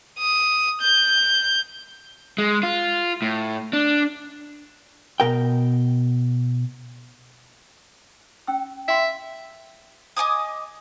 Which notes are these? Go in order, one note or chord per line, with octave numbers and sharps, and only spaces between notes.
D#6
G6
G#3
F4
A2
D4
B2 A#4 G5
C#4 G5 E6
E5 F5 G5 C6
D#5 G#5 D6 D#6